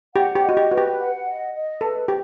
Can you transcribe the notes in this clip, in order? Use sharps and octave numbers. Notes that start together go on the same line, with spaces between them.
G4 F#5
G4
D#5
F#4
G4
F#4 B4
G4
F#5
D#5
D#5
A4 B4
G4